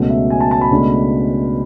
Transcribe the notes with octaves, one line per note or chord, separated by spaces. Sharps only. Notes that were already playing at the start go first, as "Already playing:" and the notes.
Already playing: C#2 B2 F#3 A3
E5
G#5
A5
A5
B5
C#2 B2 A3 D4